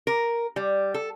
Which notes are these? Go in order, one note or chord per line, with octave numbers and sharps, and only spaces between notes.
A#4
G3
A4